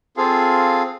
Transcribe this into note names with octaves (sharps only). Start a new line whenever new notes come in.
C4 F4 G#4 A4 F5